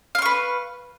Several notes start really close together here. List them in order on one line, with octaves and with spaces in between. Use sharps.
F5 C6 C#6 B4